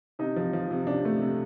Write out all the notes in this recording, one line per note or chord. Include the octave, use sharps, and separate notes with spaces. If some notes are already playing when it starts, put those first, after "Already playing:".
C3 D#4
F3
F3
C3
C3 D4
A3
C3